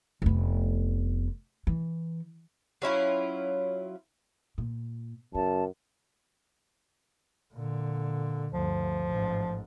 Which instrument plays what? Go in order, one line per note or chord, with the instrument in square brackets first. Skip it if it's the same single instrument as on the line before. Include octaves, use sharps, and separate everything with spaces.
[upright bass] F1 B3
E3
[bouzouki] F#3 C#4 E4 F4
[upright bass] A#2
[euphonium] F#2 [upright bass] C#3 [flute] A5
[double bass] A#2 D3
[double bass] D2 G2 [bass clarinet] F3
[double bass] A1 G#2